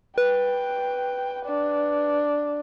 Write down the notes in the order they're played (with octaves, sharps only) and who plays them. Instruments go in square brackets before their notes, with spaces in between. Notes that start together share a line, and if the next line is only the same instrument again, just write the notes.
[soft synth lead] B4 [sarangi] G5
[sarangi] D4